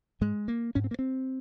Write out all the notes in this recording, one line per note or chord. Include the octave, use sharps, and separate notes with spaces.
G#2 G#3
A#3
G#2 C#4
C4
A#3
C4